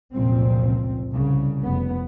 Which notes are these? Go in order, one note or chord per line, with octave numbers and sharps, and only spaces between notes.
F1 C#2 F#2 A#2 F3 C4
C2 C#3
F1 B3